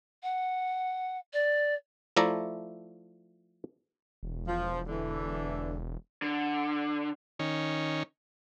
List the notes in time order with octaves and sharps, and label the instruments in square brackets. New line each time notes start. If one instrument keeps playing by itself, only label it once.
[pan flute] F#5
D5
[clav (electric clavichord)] F3 A3 E4 D5 A#5
[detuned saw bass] E1
[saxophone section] F3
D3 E3
[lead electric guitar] D3
[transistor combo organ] D#3 C#4